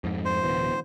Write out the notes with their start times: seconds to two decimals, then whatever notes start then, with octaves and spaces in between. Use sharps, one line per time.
0.04 F2 G#2
0.25 C5
0.43 D1 B2 E3